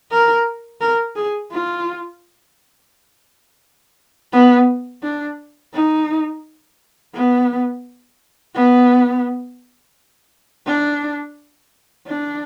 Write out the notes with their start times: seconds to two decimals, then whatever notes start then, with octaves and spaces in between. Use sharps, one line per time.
0.11 A#4
0.81 A#4
1.16 G#4
1.52 F4
4.33 B3
5.03 D4
5.73 D#4
7.14 B3
8.55 B3
10.67 D4
12.07 D4